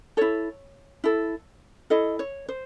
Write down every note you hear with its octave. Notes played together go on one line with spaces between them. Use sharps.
E4 A4 C#5
E4 A4
E4 A4 D#5
C#5
C5